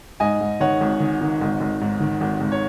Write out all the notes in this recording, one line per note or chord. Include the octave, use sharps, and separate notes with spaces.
G#2 D#5 G#5
G#2
D#3 C#5 F#5
G#1
D#3
D#3
G#1
G#1
G#2
D#3
G#1
G#1
C#5